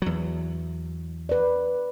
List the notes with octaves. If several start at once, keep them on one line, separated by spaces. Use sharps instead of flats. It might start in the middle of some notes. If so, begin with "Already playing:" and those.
E2 F#3
B4 D5